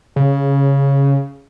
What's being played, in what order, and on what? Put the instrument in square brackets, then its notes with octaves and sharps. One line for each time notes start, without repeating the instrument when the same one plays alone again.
[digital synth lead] C#3